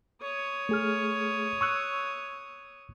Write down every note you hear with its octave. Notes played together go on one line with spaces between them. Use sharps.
C#5 D#6
A3 G#4 F6
C#6 E6 F#6